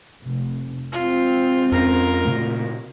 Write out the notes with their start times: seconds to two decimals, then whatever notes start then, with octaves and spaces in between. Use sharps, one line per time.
0.23 F1
0.92 G#3 C4 F4
1.72 F2 C#4 F4 A#4
2.25 A#2 C#3 A3